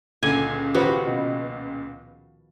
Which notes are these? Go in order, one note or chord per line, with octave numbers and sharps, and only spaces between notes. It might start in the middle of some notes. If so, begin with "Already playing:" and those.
C#2 A#2 D3 G#5
D#3 F3 B3 F#4 G4 B4 C5
B2